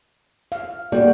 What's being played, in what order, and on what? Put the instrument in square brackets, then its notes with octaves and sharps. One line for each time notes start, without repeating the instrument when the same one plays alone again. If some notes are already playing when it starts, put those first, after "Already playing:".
[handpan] F5
[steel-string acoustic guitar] G3 [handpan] A#3 F#4